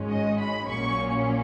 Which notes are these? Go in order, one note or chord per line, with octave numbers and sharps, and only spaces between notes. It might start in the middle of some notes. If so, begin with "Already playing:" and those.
Already playing: G#1 G#2 D#3 G#3 C#4
D#5
B5
A#1 A#2 F#3 A#3 C#4 C#6